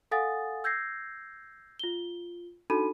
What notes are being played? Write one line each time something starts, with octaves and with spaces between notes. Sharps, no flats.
A4 F5 F#5 G#5 D#6 A6
E6 G6 G#6 A#6 C7
F4 G7
D4 D#4 F#4 A4 B5 D#7